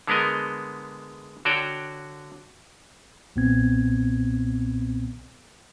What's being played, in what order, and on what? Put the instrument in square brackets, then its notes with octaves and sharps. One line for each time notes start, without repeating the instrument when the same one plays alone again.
[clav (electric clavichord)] D3 G#3 B3 A#4 D#5
D3 F#4 C#5 D5 G5
[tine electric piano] B1 A#2 B3 C4 G#6